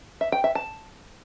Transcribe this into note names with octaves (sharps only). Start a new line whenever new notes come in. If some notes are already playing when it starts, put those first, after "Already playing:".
E5
G5
E5
A5